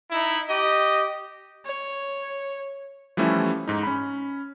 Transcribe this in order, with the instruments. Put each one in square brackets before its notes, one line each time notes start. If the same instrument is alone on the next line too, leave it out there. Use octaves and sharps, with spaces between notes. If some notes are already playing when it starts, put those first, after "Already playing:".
[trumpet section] D#4 E4
G4 D#5
[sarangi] C#5
[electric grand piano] E3 F3 G3 A3 C#4 E4
G#2 D#4
C#4 B5